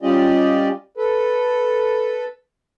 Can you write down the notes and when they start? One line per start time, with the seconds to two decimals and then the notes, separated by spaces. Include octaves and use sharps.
0.02 G3 C#4 F4 G4 D5 D#5
0.97 A4 B4